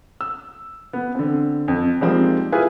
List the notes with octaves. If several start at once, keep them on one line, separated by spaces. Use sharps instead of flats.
E6
B3
D3 C4
F2
F3 G3 G#3 A#3 C4 D#4
E4 F4 G#4 B4 G#5